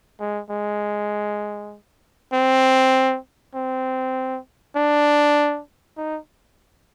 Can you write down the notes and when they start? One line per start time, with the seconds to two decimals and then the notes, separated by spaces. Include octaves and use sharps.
0.19 G#3
0.50 G#3
2.33 C4
3.54 C4
4.76 D4
5.97 D#4